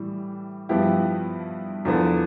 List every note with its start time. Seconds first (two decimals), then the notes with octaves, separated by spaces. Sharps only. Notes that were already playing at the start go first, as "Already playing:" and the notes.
Already playing: A2 E3 G3
0.69 G2 F3 B3 E4 G4
1.85 E2 D3 F3 B3